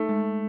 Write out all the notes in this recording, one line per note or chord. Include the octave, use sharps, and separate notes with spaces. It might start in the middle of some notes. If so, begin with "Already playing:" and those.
Already playing: A3 D#4
G#3